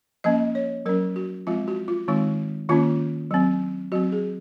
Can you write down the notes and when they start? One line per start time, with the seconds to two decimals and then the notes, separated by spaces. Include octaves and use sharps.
0.24 F3 A#3 C#4 D#5
0.55 C#5
0.86 F#3 C#4 A#4
1.16 F#4
1.47 F3 G#3 C4 F4
1.68 F#4
1.88 F4
2.08 D#3 G#3 C4 D#4
2.69 D#3 A#3 C#4 F4
3.31 F#3 C4
3.92 F#3 C4 F#4
4.12 G#4